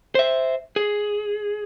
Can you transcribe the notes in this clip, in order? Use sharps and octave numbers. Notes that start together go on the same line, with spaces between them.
C5 E5
G#4